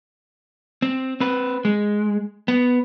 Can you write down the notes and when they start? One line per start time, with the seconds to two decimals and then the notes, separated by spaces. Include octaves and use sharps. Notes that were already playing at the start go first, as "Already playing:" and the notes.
0.82 C4
1.20 C4 B4
1.65 G#3
2.48 B3